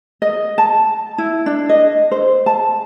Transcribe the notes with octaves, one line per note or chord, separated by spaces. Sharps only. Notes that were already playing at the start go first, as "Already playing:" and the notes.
D#5
A5
E4
D4
D#5
C5
A5